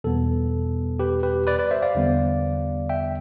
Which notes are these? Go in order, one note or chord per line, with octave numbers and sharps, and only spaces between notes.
E2 B2 G3 B3 A4
G4 B4
G4 B4
B4 D5
B4 D5
C5 E5
D5 F5
E2 D3 G3 B3
E5 G5